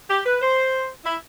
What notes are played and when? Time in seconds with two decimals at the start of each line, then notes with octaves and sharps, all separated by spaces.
0.09 G4
0.26 B4
0.42 C5
1.05 E4